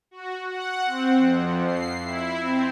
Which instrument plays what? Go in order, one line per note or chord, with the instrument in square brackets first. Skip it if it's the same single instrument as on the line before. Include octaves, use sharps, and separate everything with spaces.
[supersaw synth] F#4
F#5
C4
F2
C7
E4
C4